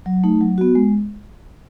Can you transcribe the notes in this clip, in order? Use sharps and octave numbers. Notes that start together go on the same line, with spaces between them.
F#3
A3 D#4
F#3
B3 F#4
G#3